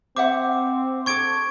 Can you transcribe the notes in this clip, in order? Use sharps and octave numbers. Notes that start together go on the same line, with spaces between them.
C4 C5 E5 F#5 D6
D4 A4 C#6 G#6 D7